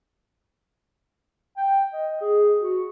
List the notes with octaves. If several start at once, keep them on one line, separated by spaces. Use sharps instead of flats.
G5
D#5
G#4
F#4